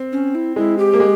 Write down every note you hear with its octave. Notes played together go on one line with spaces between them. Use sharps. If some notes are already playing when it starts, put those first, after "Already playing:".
Already playing: C4
C#4
E4
G#3 E4
G4
A#3
G#3